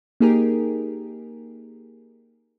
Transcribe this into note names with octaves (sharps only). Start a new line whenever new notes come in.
A#3 D#4 G4 G#4 A#4